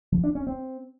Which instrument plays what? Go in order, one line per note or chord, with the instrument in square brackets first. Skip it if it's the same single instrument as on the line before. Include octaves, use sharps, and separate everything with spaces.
[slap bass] F3
D4
C#4
C4